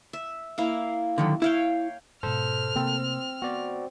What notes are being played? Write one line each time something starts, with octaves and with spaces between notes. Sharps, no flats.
E5
A#3 E4 F5
D3 D#3 F#3
E4 C#5 F5 G5
G#2 B2 A4 C5 F6
C3 A#3 C4
B3 F#4 D5